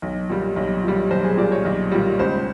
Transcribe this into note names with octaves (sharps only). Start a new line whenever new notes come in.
B1
A#2 G3
B1
A#2 G3
B1 C5
G#4
A#2 G3 D5
C#5
B1
A#2 G3
C#2 C5